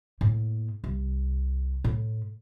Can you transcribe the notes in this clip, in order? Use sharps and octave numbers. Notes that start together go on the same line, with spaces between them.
A2 A#3
C2
A2